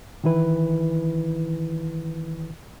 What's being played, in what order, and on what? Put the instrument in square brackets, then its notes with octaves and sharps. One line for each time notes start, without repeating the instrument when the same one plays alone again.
[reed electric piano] D#3 E3 E4 B4